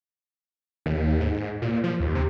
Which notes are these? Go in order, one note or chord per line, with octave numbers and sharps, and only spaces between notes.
D#2
G#2
A#2
F3
D#2
C3